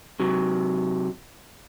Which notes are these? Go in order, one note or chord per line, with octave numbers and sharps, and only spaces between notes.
C3 F#3